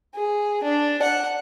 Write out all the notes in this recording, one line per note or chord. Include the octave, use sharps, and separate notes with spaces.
G#4
D4
F#5